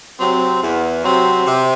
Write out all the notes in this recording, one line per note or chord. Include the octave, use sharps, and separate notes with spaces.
C3 F#3 C4
E2
C3 F#3 C4
C3